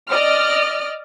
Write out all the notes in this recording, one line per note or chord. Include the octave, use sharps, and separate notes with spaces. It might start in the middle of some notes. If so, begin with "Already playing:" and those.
D5 D#5 F6